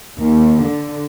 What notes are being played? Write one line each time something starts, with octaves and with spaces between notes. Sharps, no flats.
D#2
D3